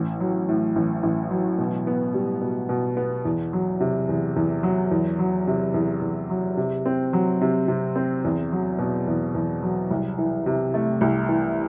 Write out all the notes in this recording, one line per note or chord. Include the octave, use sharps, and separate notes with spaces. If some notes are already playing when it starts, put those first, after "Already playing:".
Already playing: A1
F#3
A2
A1
A1
F#3
B2
B3
G3
B2
B2
B3
E2
F#3
C3
E2
E2
F#3
E2
F#3
C3
E2
E2
F#3
C3
C4
F#3
C3
C3
C4
E2
F#3
B2
E2
E2
F#3
C2
E3
C3
A3
C2
E3